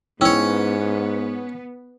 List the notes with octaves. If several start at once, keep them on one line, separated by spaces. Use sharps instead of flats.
G#2 B3 C#4 E4 C#5 G5 E6